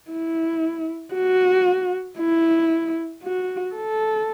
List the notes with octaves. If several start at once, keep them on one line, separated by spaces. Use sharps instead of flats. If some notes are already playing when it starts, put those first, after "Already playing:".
E4
F#4
E4
F#4
A4